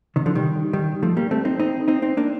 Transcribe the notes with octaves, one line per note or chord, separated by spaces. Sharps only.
C3 D#3
D3 F3
D#3 G3
D#3 G3
F3 A3
G3 A#3
A3 C4
C4 D#4
C4 D#4
C4 D#4
C4 D#4
A#3 D4